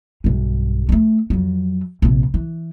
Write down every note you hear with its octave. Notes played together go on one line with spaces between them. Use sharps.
B1 G2
G#3 A3
F2 F#3
A#1 C3
E3